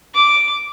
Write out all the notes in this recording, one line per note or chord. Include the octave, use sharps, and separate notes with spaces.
D6